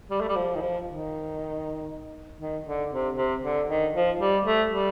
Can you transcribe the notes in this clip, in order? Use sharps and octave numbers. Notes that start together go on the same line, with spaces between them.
G3
A3
G3
F3
D#3
F3
D#3
D#3
D3
C3
C3
D3
D#3
F3
G3
A3
G3